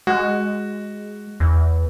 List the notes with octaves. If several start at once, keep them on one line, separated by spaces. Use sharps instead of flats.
G#3 F#4
E2